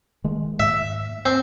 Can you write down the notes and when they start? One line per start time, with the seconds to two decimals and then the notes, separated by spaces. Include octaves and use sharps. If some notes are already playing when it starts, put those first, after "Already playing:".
0.24 D#3 G#3 A3
0.60 G#2 E5
1.26 C4